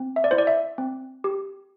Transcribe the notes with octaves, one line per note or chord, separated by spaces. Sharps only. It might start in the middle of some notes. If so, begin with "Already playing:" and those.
Already playing: C4
E5
D5
E4 C5
D5
E5
C4
G4